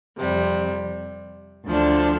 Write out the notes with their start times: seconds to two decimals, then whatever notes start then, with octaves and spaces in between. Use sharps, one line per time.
0.17 F2 C3 G3
1.66 D2 D3 F3 D4 A4